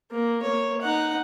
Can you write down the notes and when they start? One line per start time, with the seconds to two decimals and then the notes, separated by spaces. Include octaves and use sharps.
0.11 A#3
0.42 A#3 C#5
0.81 D#4 F#5